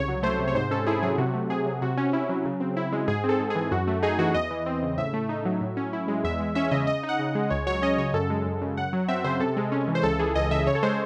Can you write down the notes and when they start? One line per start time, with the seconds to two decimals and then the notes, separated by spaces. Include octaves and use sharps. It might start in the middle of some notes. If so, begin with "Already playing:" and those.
Already playing: C2 C#3 C#5
0.08 F#3
0.23 A3 C5
0.39 C3
0.48 C#5
0.55 G#2 C5
0.71 C#4 A4
0.86 E4 G#4
1.02 F#3 G#4
1.18 C3 F#4
1.34 A3
1.50 C3 G#4
1.66 F#3
1.82 C3 F#4
1.97 C#4
2.13 E4
2.29 F#3
2.45 C#3
2.60 C4
2.77 E4
2.92 G#3
3.08 G#2 G#4
3.24 C4
3.29 A4
3.40 G#2
3.50 G#4
3.55 E3
3.71 F#2 F#4
3.87 A3 F#4
4.02 D#4 G#4
4.19 E3 F#4
4.34 E2 D#5
4.51 E3
4.66 C4
4.82 C#3
4.97 A2 E5
5.13 A3
5.29 D#4
5.45 F#3
5.61 A2
5.77 C#4
5.93 E4
6.08 G#3
6.24 E2 E5
6.40 G#3
6.55 C#4 E5
6.71 C#3 D#5
6.87 C#3 D#5
7.03 D#4
7.09 F#5
7.19 C#3
7.35 G#3
7.50 C#2 C#5
7.67 F#3 C#5
7.82 C#4 D#5
7.98 C#3 C#5
8.13 F#2 A4
8.30 G#3
8.45 F#2
8.61 C#3
8.77 F#2 F#5
8.93 F#3
9.08 C4 E5
9.24 C#3 C5
9.40 C3 A4
9.57 G#3
9.72 C#4
9.88 E3
9.95 C5
10.03 C#2 A4
10.19 E3 G#4
10.35 C#2 D#5
10.51 C#3 E5
10.67 C#3 C#5
10.75 A4
10.83 G#3 C5